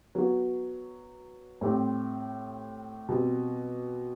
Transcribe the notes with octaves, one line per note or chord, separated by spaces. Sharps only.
F#3 B3 F#4
A2 G3 C4 G4
B2 G3 C4